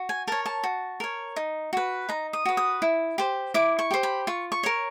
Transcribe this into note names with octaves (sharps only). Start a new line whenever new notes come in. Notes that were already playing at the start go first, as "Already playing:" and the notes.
Already playing: F#4
G#5
A#4 C#5 A5
A5
F#4
A#4 C#5
D#4
F#4 B4
D#4 A#5
D#6
F#4 B4
D#6
E4
G4 C5
E4 D6
C#6
G4 C5
B5
F4 C#6
C#6
A#4 C#5